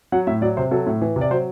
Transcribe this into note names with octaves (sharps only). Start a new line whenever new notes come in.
F#3 F#5
A2 E5
F#3 D5
C3 C5
F#3 A4
A2
E3
C3
D5
F#3 C5